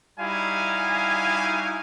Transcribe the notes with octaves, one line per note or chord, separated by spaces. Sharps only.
G3 D#4 E4 F#4 F5 G#5